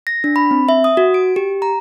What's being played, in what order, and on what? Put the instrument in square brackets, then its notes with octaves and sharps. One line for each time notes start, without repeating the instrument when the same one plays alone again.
[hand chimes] A#6
D4
B5
C4
E5
D#6
F#4
D7
G4
A#5